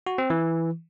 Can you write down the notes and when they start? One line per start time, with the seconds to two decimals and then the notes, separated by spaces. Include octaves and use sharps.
0.07 F#4
0.18 C4
0.30 E3